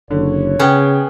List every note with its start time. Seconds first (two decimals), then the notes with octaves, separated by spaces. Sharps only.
0.11 F#1 D3 C#5
0.59 C#3 B3 C#4 G#4 G5